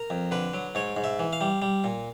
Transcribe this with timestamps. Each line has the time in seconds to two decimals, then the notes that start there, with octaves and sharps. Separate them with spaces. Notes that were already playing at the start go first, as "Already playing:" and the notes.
Already playing: A#4
0.10 F2
0.31 D3 B4
0.54 F#3
0.75 G#2 C#5
0.96 G#2
1.04 E5
1.19 E3
1.33 F5
1.41 G3
1.62 G3
1.84 A#2